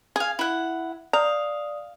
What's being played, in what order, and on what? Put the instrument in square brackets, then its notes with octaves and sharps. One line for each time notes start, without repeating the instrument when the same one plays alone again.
[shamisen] G#4 [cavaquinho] F5 G#5
[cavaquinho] E4 F#5
[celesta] D5 D#6 F7 [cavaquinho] F5 [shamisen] A#5